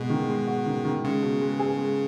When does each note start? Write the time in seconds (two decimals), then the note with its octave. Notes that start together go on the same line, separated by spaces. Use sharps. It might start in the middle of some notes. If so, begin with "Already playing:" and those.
Already playing: B2 G#3
0.10 D#3
0.28 G#3
0.47 F#4
0.66 D#3
0.84 D#3
1.04 C#3 G#3
1.23 B2
1.41 G#3
1.59 G#4
1.78 G#3